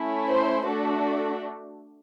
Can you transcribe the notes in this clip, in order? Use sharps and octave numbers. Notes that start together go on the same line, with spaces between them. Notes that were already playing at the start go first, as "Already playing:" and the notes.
Already playing: A3 C#4 E4
C5
A3 D4 F#4 A4